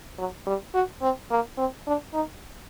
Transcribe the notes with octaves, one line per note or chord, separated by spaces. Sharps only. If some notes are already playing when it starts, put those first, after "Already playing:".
F#3
G3
F#4
C4
A#3
C4
D4
D#4